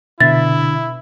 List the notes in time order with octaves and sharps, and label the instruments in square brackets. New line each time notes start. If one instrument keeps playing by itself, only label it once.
[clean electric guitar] C2 D3 E5 [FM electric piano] B2 [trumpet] E4 [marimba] A6